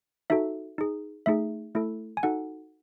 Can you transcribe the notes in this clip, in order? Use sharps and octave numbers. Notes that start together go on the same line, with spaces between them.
D#4 F#4 A4 E5
D#4 G#4
A3 D#4 G#4 E5
A3 E4 A4
G#5
D#4 F#4 A4 F#5